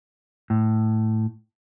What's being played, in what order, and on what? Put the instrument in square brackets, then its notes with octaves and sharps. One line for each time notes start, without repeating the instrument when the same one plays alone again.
[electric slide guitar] A2